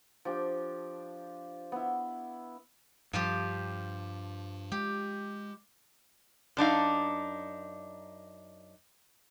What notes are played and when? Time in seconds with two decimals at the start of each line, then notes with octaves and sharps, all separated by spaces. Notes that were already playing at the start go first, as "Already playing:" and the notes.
0.25 F3 D4 G4
1.72 B3 E4
3.13 G2 F3 G3 F4 G4
4.72 G#3 G4
6.57 F#2 D4 D#4 F5